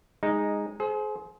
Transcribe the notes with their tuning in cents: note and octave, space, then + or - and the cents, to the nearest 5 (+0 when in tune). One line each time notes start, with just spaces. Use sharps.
G#3 -10 D#4 +0
G#4 +35 C5 +0